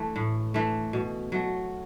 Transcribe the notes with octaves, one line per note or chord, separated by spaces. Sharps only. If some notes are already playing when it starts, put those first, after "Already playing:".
Already playing: E3 A3
A2
E3 A3
B2
F#3 A3